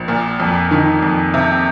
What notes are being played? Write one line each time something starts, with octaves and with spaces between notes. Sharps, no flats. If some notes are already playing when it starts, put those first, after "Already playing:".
Already playing: A#1
A#2
F2
D#3
F2
C3